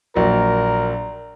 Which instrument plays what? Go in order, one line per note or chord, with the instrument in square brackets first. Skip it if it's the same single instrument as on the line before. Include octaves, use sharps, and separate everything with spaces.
[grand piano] A#1 F#3 [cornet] A#4